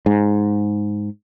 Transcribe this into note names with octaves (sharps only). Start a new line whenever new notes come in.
G#2